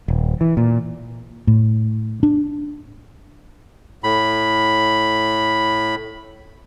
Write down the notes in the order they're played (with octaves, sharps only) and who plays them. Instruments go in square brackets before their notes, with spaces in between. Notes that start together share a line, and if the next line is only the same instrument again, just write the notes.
[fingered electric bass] D#1
E3
A#2
[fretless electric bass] A2
D4
[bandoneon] A2 B5